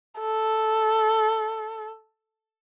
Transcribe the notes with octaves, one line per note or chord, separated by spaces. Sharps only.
A4